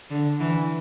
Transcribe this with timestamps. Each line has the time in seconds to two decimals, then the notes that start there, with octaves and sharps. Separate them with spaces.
0.11 D3
0.40 E3